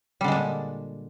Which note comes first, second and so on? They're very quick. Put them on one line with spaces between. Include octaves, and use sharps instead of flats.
G3 D3 G#3 D4 A#2